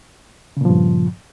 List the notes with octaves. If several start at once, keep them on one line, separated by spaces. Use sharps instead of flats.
G2 A#2 C#3 F3